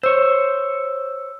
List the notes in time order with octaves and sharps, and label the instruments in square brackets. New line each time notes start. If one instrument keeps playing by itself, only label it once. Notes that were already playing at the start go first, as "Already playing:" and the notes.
[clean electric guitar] C5 C#5 [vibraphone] E6